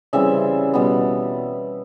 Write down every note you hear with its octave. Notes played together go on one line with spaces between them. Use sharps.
C#3 E3 G3 C4 E5
B2 G3 B3